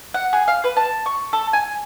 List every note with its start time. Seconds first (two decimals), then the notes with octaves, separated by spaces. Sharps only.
0.14 F#5
0.33 G#4
0.48 F5
0.64 B4
0.77 A5
1.06 C#6
1.33 A4
1.53 G#5